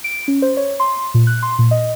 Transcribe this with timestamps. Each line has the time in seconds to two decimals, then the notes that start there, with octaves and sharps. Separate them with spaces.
0.04 D7
0.28 C#4
0.42 C5
0.57 C#5
0.80 C6
1.14 A#2
1.27 F#6
1.43 C6
1.59 A#2
1.71 D#5